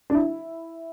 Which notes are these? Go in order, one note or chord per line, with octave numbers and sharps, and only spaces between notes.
D4
E4